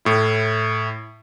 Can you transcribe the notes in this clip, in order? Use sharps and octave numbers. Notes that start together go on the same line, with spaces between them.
A2 E4